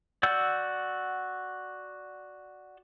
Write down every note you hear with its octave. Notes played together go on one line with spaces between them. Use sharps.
F#4 D5 F#5 E6 G6